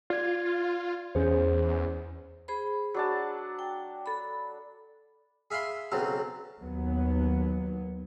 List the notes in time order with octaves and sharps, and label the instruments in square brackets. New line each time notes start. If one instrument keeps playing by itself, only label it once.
[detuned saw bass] F4 [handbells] D5 G#6
[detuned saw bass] E2 [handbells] C#4 G#4 C5
[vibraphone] G#4 C5 B5
[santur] F#3 D4 A5
[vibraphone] G5
A4 B5
[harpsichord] G#4 E5 F5 B5 C6
B1 C#3 F#3 C4 A5
[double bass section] D#2 F#3 B3